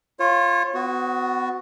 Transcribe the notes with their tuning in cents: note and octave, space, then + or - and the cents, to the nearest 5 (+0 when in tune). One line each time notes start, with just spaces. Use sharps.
F4 +0 C#5 -30
B3 +30 F#4 +0